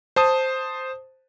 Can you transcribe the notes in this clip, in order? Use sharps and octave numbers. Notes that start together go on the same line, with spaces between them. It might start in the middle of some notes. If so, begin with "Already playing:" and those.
C5 A5 D#6